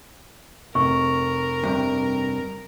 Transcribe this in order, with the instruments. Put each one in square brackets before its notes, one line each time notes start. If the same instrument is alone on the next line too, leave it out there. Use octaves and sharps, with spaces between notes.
[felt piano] F1 [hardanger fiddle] A#4 [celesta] C#6
[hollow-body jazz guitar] G2 C3